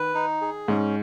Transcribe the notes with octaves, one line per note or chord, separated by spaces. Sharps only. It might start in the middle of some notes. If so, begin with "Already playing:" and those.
Already playing: D#3 B4
D#4
G#4
G#2 C#4